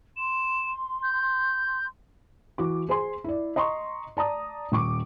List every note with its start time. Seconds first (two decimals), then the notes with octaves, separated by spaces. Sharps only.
0.17 C6 E7
1.03 G6
2.58 E3 F#4 D6
2.89 G#4 C5 G#5 C6
3.24 E4 D5
3.56 D#5 A#5 C6 C#6
4.17 D5 A5 A#5 D#6
4.72 D#1 C#6 D6